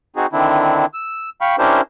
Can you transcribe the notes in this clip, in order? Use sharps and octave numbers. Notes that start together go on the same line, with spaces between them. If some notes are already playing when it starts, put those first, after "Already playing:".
C4 D#4 F#4 G#4
D3 D#3 C4 D4 E4
E6
F5 G5 B5 C#6 F6
C#4 D4 E4 G4 A#4 C5